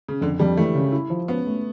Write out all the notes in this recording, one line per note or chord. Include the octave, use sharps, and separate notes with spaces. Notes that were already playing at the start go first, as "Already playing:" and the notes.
C#3
F2 D3
F2 G3
E3 A3
C#3
E4
F3
B3 C#4
A3